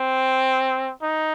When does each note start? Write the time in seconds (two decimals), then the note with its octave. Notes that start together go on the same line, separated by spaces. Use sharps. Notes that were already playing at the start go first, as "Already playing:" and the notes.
Already playing: C4
1.02 D#4